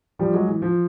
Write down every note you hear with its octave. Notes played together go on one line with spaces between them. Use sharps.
F3 G3
F#3 G#3
E3
F3